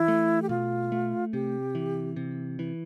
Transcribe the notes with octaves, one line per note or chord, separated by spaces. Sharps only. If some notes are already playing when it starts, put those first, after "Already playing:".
Already playing: E3 E4
A3
G4
B2 F4
A3
C3 G4
E3
C3
E3